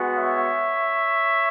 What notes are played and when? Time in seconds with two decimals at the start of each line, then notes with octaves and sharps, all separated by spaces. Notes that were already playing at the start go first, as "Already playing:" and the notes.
Already playing: G#3 B3 F#4
0.17 C#5 E5